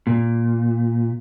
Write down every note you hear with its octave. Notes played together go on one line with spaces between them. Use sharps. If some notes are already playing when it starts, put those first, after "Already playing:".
A#2